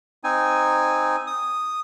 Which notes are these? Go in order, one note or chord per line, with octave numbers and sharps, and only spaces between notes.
C4 D#4 G#5
D#6